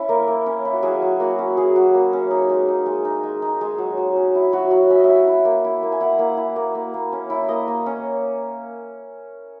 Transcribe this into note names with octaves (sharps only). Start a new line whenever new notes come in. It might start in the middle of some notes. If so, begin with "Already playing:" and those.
Already playing: C#4 E4
A#3 A#4
A#3
C#4
E4
F#4
F#3 G#4
F#3
A#3 F#4
C#4
F#3 G#4
F#3
A#3
C#4
D#4
G#3
D#4
G#3
D#4
G#3
D#4
G#3
F#3
F#3
C#4
E4
F#3 F#4
F#3
C#4 E5
D#5
E4 E5
E4
A#3
E4
A#3
G#5
E4 F#5
A#3
E4
A#3
A#3
A#3
C#4
E4
A#3 D#5
A#3
C#4